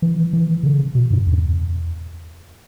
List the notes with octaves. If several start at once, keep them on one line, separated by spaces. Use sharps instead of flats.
E3
E3
C#3
B2
G2
E2